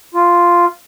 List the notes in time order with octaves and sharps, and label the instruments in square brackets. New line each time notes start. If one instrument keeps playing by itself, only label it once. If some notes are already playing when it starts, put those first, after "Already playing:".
[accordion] F4